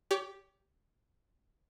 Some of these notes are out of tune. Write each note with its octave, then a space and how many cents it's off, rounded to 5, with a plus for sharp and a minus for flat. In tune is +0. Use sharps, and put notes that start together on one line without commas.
G4 +0 C#5 +35